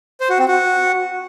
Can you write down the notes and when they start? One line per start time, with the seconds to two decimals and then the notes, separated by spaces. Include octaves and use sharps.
0.20 C5
0.30 F#4
0.39 C4
0.48 F#4